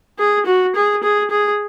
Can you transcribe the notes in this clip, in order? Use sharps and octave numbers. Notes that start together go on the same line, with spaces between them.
G#4
F#4
G#4
G#4
G#4